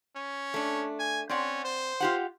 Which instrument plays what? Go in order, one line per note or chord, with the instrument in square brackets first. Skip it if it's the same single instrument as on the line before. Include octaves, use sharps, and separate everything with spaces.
[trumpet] C#4
[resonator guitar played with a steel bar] A3 D4
[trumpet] G#5
[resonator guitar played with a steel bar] C4 D5 F#5 [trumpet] C#4
[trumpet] C5
[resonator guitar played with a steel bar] F4 G4 F#5